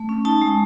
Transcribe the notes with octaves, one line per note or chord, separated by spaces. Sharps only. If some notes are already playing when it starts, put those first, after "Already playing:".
Already playing: A3
C#4
D#4 A5
G#3